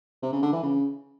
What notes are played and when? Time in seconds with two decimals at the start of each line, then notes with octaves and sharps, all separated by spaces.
0.22 C3
0.32 C#3
0.43 D3
0.53 E3
0.63 C#3